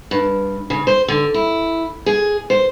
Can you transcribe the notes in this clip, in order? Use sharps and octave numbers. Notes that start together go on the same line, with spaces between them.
G2
C#3
C5
D3
E4
G#4
C5